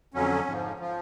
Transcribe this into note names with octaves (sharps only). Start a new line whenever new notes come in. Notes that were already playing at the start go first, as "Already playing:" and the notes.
F2 D3 F#3 C#4
G#2 F3
F3